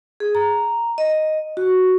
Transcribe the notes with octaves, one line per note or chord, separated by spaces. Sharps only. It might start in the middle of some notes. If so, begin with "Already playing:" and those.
G#4
A#5
D#5
F#4